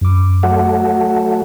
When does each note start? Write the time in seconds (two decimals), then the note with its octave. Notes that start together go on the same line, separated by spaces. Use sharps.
0.01 F#2 D6
0.43 F#3 A3 F#5